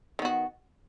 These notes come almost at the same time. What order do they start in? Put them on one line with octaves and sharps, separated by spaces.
D#3 B3 F#4